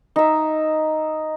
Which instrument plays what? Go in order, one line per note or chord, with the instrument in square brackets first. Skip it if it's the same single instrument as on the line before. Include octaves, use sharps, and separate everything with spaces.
[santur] D#4 E5